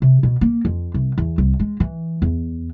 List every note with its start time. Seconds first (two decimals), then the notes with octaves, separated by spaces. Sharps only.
0.02 C3
0.23 B2
0.41 A#3
0.65 F2
0.94 C2
1.18 E2
1.38 C2
1.60 G#3
1.80 E3
2.22 E2